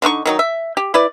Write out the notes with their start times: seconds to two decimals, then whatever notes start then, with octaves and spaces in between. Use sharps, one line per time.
0.02 D3 D4 D#4 C#6
0.26 D#3 F#3 D#4
0.39 E5
0.77 G4
0.94 E4 B4 D5